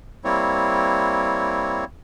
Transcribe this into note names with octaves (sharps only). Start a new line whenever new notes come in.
G3 A#3 C4 E4 C#5